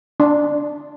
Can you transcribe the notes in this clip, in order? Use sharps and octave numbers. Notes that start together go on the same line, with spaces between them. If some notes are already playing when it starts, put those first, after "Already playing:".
D4